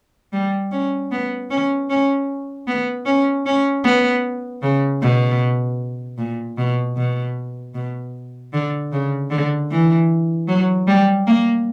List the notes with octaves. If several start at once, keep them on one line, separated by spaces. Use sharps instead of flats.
G3
C#4
B3
C#4
C#4
B3
C#4
C#4
B3
C#3
B2
A#2
B2
B2
B2
D3
C#3
D3
E3
F#3
G3
A#3